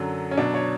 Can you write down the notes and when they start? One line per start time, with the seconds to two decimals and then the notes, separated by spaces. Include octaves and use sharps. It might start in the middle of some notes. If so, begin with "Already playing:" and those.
Already playing: F#2 D3 F#3
0.31 C#4
0.38 B2 F#3 D4
0.54 C#5